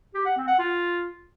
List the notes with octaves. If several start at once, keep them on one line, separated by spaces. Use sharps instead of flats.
G4
F#5
C4
F#5
F4